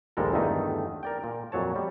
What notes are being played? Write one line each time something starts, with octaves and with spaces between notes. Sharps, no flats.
A#1 D#2 G3 G#3 A4 A#4
E2 G2 D3 D#3 A3 D#4
A#4 D5 G5
A#2
F2 A#2 F#3 C#5 A5
G3